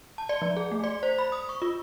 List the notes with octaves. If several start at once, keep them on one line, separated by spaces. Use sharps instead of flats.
A5
D5
F3
G#4
A3
D5
C5
B5
D#6
C#6
F4